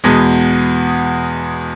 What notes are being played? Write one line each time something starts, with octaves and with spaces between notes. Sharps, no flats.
E2 B2 G#3 B3